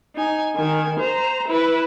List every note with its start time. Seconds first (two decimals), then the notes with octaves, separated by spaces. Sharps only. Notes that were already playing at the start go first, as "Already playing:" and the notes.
0.15 D#4 G#5
0.56 D#3 G#5
0.99 C5 A#5
1.48 E4 B4